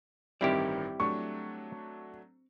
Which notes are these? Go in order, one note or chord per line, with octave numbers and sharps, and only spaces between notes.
A1 G2 D#3 G3 C4 E4 G4 D5
F#3 A3 D4 C#6